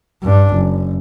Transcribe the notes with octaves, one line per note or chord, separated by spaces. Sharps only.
G2 D4
F#1